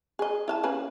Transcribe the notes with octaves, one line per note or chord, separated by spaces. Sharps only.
G#4 D#5
E4 F5 A5
A#3 C#4 B4